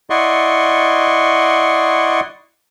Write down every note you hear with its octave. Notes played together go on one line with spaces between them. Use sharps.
E4 D5 D#5 F#5 C6 C#6